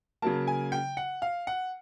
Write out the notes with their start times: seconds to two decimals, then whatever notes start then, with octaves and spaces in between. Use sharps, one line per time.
0.22 C#3 F#3 A#3 A5
0.47 G#5
0.72 G5
0.97 F#5
1.22 F5
1.47 F#5